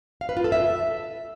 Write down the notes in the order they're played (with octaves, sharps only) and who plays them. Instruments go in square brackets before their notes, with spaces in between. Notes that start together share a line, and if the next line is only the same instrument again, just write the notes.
[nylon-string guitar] F5
B4
F4
A4
E5